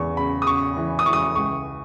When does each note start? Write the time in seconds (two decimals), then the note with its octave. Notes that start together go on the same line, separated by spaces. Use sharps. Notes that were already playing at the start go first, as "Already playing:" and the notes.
Already playing: E2 C#3 C#6
0.17 C#3 B5
0.42 D#6
0.47 C#3 C#6
0.77 E3
0.99 D#6
1.06 E3 C#6
1.13 D#6
1.35 C#2 C#6